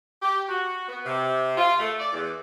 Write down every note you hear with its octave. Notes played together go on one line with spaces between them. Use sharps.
G4
F#4
B3
C3
F4
A3
D5
E2